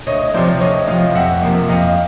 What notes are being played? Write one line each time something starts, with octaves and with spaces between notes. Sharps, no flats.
D2 C#5 D#5
C3 F3 C5 D5
D2 C#5 D#5
C3 F3 D#5 F5
F2 E5 F#5
C3 F3 A#3
F2 D#5 F5